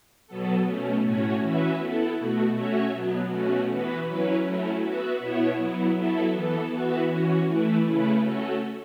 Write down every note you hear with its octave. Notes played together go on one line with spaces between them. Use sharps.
B2 F#3 B3 A4
B2 A3 C#4
A2 A3 C#4 F#4 C#5
E3 C#4 F#4 B4 E5
B3 E4 A4
B2 A3 F#4
A3 C#4 F#4 C#5 E5
B2 F#3 B3
B2 A3 C#4 F#4
E3 B3 F#4 B4
F#3 C#4 E4 B4
F#3 A3 C#4 E4
B3 F#4 B4 E5
B2 B3 E4 C#5 E5
F#3 B3 E4
F#3 B3 E4 A4 E5
E3 B3 A4
E3 B3 F#4 B4 E5
E3 C#4 F#4
E3 A3 E4 B4
C#3 A3 C#4 E4 B4
A3 C#4 F#4 A4